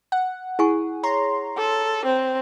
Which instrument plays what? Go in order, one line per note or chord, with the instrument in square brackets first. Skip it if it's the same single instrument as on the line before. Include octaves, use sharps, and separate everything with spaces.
[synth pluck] F#5
[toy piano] E4 G#5 C#6 [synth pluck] G#4
[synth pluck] C#5 A#5 C6
[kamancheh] A4
C4